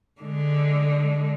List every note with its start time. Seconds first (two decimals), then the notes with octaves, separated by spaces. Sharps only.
0.21 D3 G#3